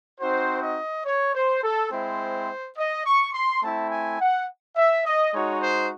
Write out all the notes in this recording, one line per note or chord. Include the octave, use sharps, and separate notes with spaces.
C4 D#4 F#4 C5
D#5
C#5
C5
A4
G#3 C4 E4 C5
D#5
C#6
C6
A3 C4 E4 A5
G#5
F#5
E5
D#5
G#3 D#4 F#4 C#5
C5